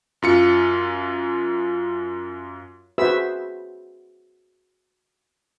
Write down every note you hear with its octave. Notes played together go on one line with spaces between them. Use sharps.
F#2 F4 C#7
F#4 G#4 B4 C5 E5 E6